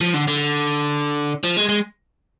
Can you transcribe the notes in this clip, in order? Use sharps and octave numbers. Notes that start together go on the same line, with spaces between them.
F3
D3
D3
F3
G#3
G#3